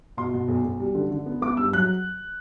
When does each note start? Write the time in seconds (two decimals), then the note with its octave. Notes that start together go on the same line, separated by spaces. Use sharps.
0.17 B2 C6
0.34 B2
0.48 B1
0.64 B1
0.80 G3
0.95 D3
1.11 D3
1.26 B3
1.42 B3 D6
1.57 G2 E6
1.73 F#3 F#6